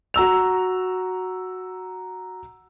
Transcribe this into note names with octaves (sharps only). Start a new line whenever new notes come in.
F#4 A#5 E6 F7